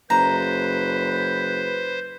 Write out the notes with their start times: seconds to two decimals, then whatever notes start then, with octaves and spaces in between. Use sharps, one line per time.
0.10 F#1 B4 C5 A#5